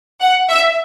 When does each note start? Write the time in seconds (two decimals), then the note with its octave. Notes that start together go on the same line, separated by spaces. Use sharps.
0.21 F#5
0.49 E5